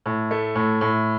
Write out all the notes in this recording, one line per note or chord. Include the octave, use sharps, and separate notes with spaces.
A2
A3
A2
A2